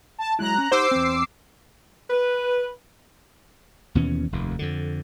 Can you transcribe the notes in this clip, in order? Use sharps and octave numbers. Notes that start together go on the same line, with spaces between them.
A5
F#3 G#3 E4 A#5 F#6
C#4
D#4 G4 C5 F#5 D6 E6 C7
E2 C4
B4
D#2 B2 E3 C#4
F1 D#2
F2 D3